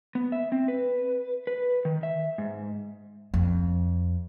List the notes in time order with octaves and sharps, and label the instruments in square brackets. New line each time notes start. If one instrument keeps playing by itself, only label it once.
[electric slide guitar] B3
E5
C4
B4
B4
D#3
E5
G#2
[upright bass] F2